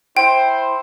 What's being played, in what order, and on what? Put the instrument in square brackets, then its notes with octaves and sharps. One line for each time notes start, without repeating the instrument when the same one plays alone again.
[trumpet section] E4 C5 [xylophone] G5